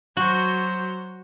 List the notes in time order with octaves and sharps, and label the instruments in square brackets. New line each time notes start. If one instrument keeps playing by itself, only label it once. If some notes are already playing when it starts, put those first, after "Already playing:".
[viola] F#3 C5 [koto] F#4